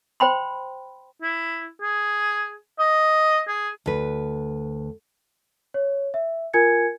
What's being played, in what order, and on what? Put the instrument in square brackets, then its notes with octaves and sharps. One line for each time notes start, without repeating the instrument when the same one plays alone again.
[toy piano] C5 G5 B5 C6
[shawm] E4
G#4
D#5
G#4
[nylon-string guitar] D2 B4
[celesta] C#5
E5
F4 A#4 G#5 G#6 C#7